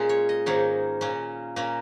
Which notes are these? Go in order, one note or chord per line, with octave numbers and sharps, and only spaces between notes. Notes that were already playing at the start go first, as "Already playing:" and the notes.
Already playing: A#2 G#3 C#4
C#5
D#5
G#2 D#3 A#3 C#4 C#5
A#2 A#3 C#4
A#2 A#3 C#4